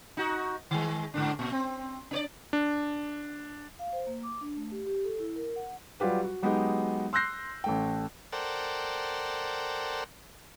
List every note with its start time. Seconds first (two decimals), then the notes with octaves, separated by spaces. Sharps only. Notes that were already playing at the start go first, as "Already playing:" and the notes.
0.17 D#4 F#4
0.71 D#3 G#3
1.14 G#2 D3 D4
1.39 A#2
1.52 C4
2.11 D4 C#5 D5
2.53 D4
3.79 F5
3.93 C5
4.07 A#3
4.23 D6
4.41 D4
4.56 A3
4.71 G4
4.87 G4
5.04 A4
5.19 E4
5.36 A#4
5.56 F#5
6.00 F#3 G3 F4 G4 B4
6.24 F#4
6.42 F#3 G#3 B3 D#4 G4 D#5
7.13 C6 E6 F#6 G6 A#6 C7
7.64 A1 A3 G5
8.32 A4 A#4 C5 D5 F#5 G5